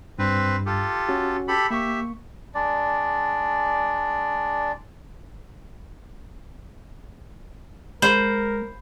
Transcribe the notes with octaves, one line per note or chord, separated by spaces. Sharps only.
G2 C4 B4
F4 G4 A4
C#4 F#4
G4 A4 B5
A#3 G4 E5 C#6
G#3 D4 D5
G#3 A#4 C5 B5